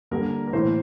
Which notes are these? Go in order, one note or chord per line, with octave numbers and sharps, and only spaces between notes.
D3 G3 A#3 A#4
A#4
A2 E3 A#3 C5